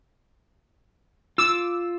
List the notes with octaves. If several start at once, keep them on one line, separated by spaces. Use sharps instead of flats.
F4 D6 E6